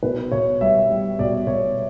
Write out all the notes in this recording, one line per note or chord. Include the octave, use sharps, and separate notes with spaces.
B2 B4
B2 C#5
G3 E5
G3
B2 D5
B2 C#5